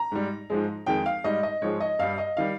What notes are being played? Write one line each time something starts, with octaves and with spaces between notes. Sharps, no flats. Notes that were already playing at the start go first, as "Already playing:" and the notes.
Already playing: A#5
G#2 G3
G#2 F3 G#3
F2 D#3 G#3 G5
F5
G#2 G3 D#5
D#5
G#2 F3 G#3 C#5
D#5
G2 G3 F5
D#5
D#3 G3 F5